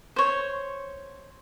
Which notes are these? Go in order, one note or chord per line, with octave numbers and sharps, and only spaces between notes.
C5 C#5